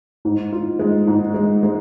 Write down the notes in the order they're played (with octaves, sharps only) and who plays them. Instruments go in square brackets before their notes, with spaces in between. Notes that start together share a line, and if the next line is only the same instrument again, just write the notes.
[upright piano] G#2
F4
G#3
G#2
G#3
G#3